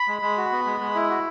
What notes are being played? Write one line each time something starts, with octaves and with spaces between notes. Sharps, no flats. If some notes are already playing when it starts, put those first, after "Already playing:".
Already playing: B5
G#3
G#3
F#4
B3
G#3
G#3
E4
F#4